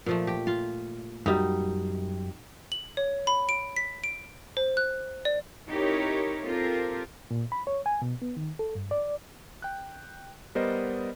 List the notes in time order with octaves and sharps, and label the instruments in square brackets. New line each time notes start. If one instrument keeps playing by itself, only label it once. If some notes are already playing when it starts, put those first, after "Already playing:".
[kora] A#2 F3 A3
G4
F4
[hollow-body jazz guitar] F#2 G3 [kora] D#4
[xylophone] F#7
C#5
B5
D7
B6
D7
C5
F#6
D5
[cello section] C4 D#4 E4 G4 A#4 C#5
C4 F4 G4 A4 A#4 C5
[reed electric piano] A#2
B5
C#5
G#5
B2
B3
D#3
A4
G2
D5
[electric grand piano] G5 F#6
G3 B3 A#4 C5 D5 D#5